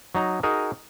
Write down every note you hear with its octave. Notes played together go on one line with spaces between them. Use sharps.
F#3 D#4 A#5
D#4 F#4 G#4 A#4